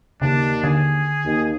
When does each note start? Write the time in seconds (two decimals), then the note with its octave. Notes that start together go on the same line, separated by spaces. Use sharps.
0.22 D#2 C#3 D4
0.64 D3 G#4
1.24 D#2